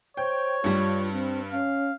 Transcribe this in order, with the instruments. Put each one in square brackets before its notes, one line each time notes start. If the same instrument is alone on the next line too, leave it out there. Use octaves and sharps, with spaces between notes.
[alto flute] C5 [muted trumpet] C#5 [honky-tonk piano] G5
[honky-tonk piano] G2 G3 [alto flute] F4
[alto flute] C4
[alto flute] C#4 [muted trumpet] F5